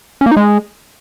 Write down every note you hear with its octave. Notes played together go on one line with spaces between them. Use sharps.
C#4
A#3
D#4
G#3